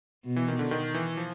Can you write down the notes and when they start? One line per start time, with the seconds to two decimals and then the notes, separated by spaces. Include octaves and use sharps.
0.25 B2
0.36 E3
0.48 D#3
0.59 D3
0.71 D#3
0.94 E3
1.17 F3